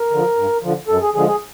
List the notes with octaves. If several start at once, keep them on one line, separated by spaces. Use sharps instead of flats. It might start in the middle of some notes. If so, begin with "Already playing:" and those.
Already playing: A#4
D3 F3
G2
D3 F3
F#2 A4
G#4
D3 F3 G#3 G#4
G#4